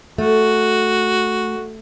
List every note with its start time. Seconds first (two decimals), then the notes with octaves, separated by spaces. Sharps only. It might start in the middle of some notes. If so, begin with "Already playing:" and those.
0.18 A3 F#4